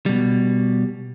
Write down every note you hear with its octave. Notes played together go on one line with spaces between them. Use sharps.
B2 G3